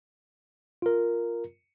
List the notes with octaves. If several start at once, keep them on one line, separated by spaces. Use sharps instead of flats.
F4 A#4